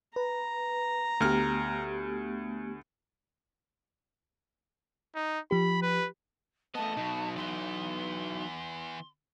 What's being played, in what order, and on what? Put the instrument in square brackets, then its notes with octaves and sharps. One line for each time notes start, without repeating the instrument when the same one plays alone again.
[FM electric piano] B4 [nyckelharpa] A#5
[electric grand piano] D2 F6 [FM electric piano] A3 B3 G4
[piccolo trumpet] D#4
[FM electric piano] F3 G4 [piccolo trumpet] B5
[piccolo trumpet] B4
[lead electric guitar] A3 B3 [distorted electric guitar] D#5 [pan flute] A5
[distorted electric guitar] B2 [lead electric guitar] F#3 D#4
[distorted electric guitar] E3 B3 [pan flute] C6